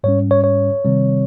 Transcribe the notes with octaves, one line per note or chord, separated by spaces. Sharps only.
G#2 G3 C#4 C#5
C#5
C#5
C3 D#3 G3 C4